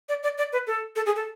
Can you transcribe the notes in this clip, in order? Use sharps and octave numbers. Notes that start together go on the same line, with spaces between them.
D5
D5
D5
B4
A4
A4
G#4
A4